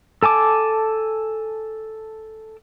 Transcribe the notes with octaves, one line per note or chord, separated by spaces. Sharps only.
A4 G#5 A5 D6